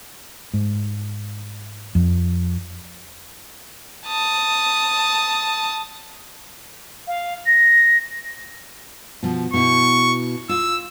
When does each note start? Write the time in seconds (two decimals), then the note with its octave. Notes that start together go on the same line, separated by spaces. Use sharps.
0.54 G#2
1.95 F2
4.07 A5 D#6
7.07 F5
7.46 A#6
9.23 B2 F3
9.54 B2 E4 C#6
10.49 F4 E6